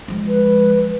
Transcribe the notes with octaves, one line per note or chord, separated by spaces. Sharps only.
F3 G#3
B4